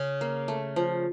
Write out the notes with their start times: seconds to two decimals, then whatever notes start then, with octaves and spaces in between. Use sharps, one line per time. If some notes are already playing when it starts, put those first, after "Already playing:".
Already playing: C#3 C#4
0.21 A#3
0.48 A3
0.76 F3